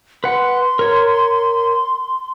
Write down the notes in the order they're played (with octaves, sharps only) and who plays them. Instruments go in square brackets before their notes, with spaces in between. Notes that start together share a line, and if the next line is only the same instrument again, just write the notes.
[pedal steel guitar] B4 F#5 [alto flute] C6
[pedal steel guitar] A#4 C#5